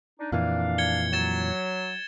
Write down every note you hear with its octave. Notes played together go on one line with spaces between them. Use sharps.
D4 D#4
F2 A#2 E3 D4 F5
G#6 C#7 G7
F#3 G#6 A6 E7